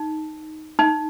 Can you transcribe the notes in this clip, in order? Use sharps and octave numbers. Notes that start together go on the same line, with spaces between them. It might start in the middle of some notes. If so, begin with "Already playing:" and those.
Already playing: D#4
D#4